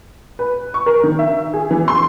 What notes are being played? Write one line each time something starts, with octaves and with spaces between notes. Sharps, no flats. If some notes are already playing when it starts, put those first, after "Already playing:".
B4
C#6
A#4
D#3
E5
G#4
E3
C6